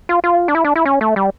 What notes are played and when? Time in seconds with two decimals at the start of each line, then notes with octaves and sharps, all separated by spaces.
0.09 F4
0.24 F4
0.48 D4
0.55 E4
0.65 D4
0.76 E4
0.85 C#4
1.01 A3
1.16 G3